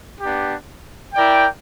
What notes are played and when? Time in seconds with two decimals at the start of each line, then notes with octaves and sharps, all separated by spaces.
0.21 B3 D4 G4
1.13 E4 A#4 D5 G5